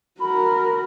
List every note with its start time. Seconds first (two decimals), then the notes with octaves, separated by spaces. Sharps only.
0.20 F#4 A#4 B5